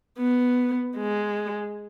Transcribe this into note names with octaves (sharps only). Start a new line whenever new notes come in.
B3
G#3